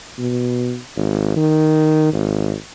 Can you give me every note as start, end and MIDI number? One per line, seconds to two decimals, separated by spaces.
0.18 0.78 47
0.97 1.33 32
1.36 2.11 51
2.13 2.54 32